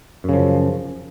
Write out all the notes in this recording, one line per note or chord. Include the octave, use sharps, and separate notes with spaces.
F#2 C#3 F3